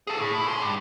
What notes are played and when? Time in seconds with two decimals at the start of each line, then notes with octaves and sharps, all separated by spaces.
0.07 G#4 A4
0.20 A2
0.35 E4
0.48 G#4 C6
0.61 G2